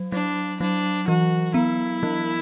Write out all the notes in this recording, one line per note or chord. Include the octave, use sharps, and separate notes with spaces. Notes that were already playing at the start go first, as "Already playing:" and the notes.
Already playing: F#3
F#3 D4
F#3 D4
E3 F#4
B3 E4
E3